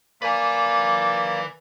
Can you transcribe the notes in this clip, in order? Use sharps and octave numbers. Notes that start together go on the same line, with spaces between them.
A#3 B4 D5 G#5